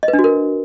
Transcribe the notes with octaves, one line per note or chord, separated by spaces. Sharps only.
D#5
B4
D4
F#4
A#4